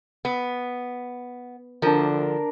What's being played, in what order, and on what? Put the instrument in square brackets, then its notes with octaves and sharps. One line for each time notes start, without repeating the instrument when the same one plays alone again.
[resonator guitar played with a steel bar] B3
[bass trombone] D3 [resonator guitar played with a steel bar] F3 [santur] D4 A#4